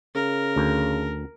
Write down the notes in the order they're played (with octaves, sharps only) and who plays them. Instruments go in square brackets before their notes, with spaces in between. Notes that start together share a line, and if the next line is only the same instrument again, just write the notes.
[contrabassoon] C#3 [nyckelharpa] A#4
[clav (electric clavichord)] D2